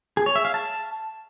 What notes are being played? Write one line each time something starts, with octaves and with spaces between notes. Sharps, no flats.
G#4
C#5
E5
F5
A5